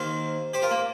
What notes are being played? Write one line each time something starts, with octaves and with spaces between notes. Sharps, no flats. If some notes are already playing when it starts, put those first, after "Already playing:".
Already playing: D#2 D#3 C5 F5
G4 C5
F4 A#4
A#3